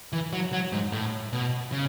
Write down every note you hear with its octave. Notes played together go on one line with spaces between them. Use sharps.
E3
F#3
F#3
G#2
A2
B2
C#3